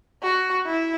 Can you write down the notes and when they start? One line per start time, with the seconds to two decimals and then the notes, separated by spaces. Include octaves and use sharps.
0.22 F#4
0.66 E4